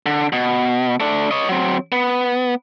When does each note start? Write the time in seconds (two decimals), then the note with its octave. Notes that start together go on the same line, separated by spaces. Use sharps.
0.06 D3
0.33 B2
1.00 A3 D4
1.31 C#5 D#5
1.49 F#3 C4
1.92 B3